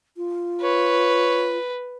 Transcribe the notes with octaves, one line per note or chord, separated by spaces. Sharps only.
F4
B4 C#5